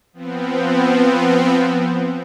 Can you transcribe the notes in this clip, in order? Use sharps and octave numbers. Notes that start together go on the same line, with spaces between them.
F3 B3 C4